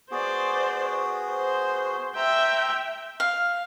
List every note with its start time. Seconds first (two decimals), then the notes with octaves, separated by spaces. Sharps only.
0.11 B3 F#4 G#4 C5 D5
1.30 C5
2.16 E5 G5 A#5 C6 E6
3.20 F5